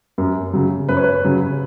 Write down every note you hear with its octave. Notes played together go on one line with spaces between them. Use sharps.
F#2
C#3 F#3
F#2 B4
C#5
B4
C#3 F#3